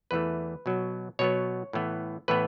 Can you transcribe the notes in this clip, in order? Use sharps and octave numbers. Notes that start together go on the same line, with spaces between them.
E2 E3 A3 B4
B2 F#3 B3
B2 F#3 B3 C#5
A2 E3 B3
A2 E3 B3 B4